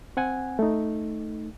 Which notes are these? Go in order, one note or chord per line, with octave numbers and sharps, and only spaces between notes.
C4 F#5 G#5
A3 D#4